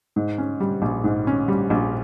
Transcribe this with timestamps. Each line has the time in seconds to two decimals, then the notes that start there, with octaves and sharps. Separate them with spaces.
0.16 G#2
0.38 C#4
0.60 G3
0.82 A#1
1.04 G#2
1.27 C#4
1.48 G3
1.70 A#1